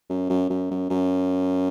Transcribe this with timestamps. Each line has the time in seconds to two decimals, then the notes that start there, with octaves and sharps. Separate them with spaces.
0.10 F#2
0.30 F#2
0.50 F#2
0.71 F#2
0.90 F#2